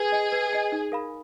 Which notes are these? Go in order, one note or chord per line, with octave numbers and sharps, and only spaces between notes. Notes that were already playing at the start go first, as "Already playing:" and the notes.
Already playing: G#4 B4
D#5 G#5
B4
D#5 G#5
D#4
A#4 F5 B5